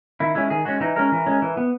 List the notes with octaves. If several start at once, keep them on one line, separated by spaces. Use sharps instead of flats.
D#3 E4
G#3 C#4 E4
D#3 G#4
G#3 C#4 F#4
E3 D#4
G#3 C#4 A#4
E3
G#3 C#4
E3
B3